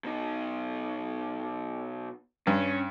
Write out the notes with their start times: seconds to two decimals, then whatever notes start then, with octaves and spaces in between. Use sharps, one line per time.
0.04 B2 D#4
2.47 G2 C#4